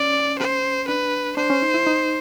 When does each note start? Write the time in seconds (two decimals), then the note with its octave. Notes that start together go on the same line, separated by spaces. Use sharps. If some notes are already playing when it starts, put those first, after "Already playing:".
Already playing: C#4 D5
0.39 C5
0.88 D4 B4
1.37 D4 C5
1.50 C#4
1.62 D#4
1.74 E4
1.87 D#4